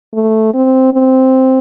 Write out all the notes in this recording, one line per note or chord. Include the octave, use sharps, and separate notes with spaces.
A3
C4
C4